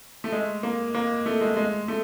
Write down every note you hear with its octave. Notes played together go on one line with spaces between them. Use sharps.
A3
G#3
A#3
A#3
A3
G#3
G#3
A3